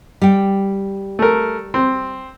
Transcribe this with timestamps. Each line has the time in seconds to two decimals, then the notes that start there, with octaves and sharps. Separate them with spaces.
0.22 G3 G5
1.19 A3 A#4
1.74 C4